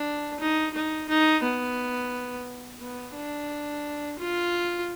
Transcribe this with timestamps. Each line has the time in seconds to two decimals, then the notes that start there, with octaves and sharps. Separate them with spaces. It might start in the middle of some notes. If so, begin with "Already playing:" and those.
Already playing: D4
0.40 D#4
0.74 D#4
1.09 D#4
1.43 B3
2.81 B3
3.15 D4
4.19 F4